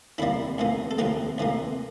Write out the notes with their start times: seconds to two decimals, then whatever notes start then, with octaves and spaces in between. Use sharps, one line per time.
0.18 D2 C3 G3 A#3 E4
0.58 D2 C3 E3 A#3
0.91 A4
0.98 D2 C3 E3 A#3 G4
1.38 D2 C3 E3 A#3